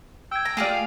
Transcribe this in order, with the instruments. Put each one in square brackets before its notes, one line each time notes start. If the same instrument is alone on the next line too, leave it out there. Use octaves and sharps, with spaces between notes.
[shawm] G5 [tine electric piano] E6 G#6
[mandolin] A#5
[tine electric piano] A3 D5 [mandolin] F4 G4 G#4
[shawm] F5